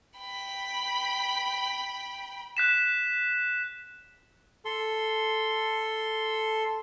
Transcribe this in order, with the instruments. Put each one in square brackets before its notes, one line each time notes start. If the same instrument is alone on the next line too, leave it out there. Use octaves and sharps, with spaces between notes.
[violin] G5 B5
[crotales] F#6 B6 E7
[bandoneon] A4 C6